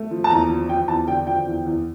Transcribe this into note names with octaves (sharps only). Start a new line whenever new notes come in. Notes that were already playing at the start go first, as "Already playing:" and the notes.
Already playing: A3
F3
A5
E2 A#5
F3
F3 G5
E2 A5
D3 G5
F3 G5
E2
E2